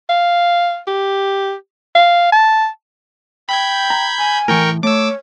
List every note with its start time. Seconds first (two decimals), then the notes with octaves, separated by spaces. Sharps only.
0.09 F5
0.87 G4
1.95 F5
2.32 A5
3.49 G5 B5 G6 G#6
3.90 A#5
4.18 G#5
4.48 A2 E3 A#4 G5 C#6
4.83 A3 C#5 D6 E6